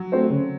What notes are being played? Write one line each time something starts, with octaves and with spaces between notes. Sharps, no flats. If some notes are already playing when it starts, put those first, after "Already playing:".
Already playing: F#3
A3 C4 F#4 C5
C#3